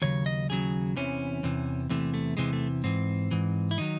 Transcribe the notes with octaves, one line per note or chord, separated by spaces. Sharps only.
D#2 C#3 F#3 C#5
D#5
D#2 C#3 F#3 G#4
E2 C3 E3 C#4
E2 C3 E3
E2 C3 E3 A3
A3
E2 C3 E3 G#3
A3
G#2 E3 C4
G#2 E3
E4
D#3 F#3 D#4